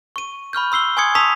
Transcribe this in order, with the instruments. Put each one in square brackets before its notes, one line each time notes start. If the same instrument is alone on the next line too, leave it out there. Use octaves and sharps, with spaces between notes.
[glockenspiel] C#6 D#7
B5 C#6 F6 G6
C6 E6 C7 G7
G#5 C6 C#6 D#6 G#6 C#7
A5 C#6 D#6 E6 B6 F7